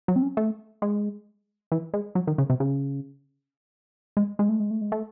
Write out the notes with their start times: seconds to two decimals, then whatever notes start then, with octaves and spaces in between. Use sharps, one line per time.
0.08 F#3
0.16 C4
0.22 C#4
0.37 A3
0.82 G#3
1.72 E3
1.94 G#3
2.15 F#3
2.27 D#3
2.38 C#3
2.50 C3
2.60 C#3
4.17 G#3
4.39 G#3
4.49 A3
4.60 G#3
4.71 A3
4.81 G#3
4.92 A3